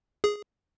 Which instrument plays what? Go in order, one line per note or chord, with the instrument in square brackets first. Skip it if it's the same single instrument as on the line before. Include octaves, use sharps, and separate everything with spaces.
[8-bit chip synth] G#4